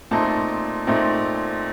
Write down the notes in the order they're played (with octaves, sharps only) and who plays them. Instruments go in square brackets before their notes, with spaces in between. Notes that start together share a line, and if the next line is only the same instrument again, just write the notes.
[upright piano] A#2 A3 C4 D#4 A5
A#2 A3 C4 D#4